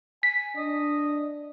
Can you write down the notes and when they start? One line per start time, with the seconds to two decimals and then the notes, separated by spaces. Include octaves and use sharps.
0.23 G#5 B6
0.56 D4 D#5